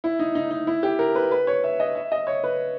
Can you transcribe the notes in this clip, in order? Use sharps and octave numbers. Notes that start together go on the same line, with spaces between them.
E4
D#4
D#4
D#4
E4
G4
A#4
B4
B4
C#5
E5
D#5
E5
D#5
C#5
B4